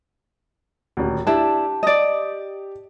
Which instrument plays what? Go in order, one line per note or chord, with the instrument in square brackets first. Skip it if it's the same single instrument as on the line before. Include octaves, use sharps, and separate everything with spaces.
[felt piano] D#1 D2
[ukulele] D4 E4 [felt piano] G4 [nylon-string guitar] A5
[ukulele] D5 D#5